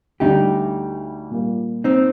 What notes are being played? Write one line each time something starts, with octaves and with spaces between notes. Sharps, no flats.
D2 D3 G3 D4 D#4 G4
A#2 G3 A#3
C4 D#4